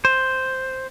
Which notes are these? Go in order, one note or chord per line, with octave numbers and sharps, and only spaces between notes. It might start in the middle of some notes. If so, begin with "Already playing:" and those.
C5